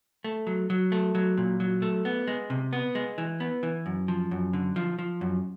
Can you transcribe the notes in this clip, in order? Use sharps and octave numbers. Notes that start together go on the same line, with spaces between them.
A3
F#3
F#3
A3
F#3
A#2
F#3
A3
B3
G#3
C3
B3
G#3
E3
B3
E3
F#2
F3
F#2
D3
F3
F3
F#2